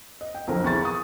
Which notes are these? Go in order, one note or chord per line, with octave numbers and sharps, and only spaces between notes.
D#5
G5
B1 F2 D3 A#4
E2 A#5 C#6 A6
C#6 D#6